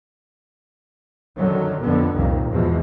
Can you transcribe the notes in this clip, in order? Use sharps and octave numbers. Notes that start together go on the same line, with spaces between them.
F#2 D3 D#3 F#3
F2 D3 B3
C2 F2 A#2 D#3
E2 G#2 B2 E3 F3